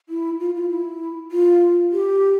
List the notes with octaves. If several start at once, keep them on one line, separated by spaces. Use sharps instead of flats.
E4
F4
F4
E4
F4
G4